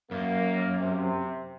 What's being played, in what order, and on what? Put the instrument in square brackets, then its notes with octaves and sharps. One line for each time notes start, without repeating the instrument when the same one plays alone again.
[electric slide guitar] F#2 [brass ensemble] A#3
[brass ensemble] C3